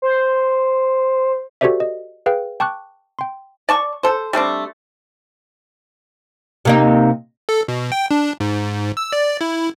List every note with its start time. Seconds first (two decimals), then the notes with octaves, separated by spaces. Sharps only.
0.02 C5
1.61 F#4 G4 A4 C5 D5 E5
1.80 D#5
2.26 G#4 B4 F5 G5
2.60 G5 A5 C#6 D6 F#6
3.19 G5 C6
3.69 D5 A5 C#6
4.03 A4 C5
4.33 G3 A3 C4 D4
6.65 C3 A#3 D#4
7.49 A4
7.68 B2
7.92 G5
8.11 D4
8.40 G#2
8.97 E6
9.12 D5
9.41 E4